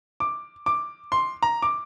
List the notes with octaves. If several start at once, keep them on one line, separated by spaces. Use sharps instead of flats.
D6
D6
C6
A#5
D6